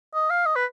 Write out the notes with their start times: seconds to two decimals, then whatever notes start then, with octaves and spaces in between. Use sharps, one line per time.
0.14 D#5
0.30 F5
0.45 D#5
0.56 B4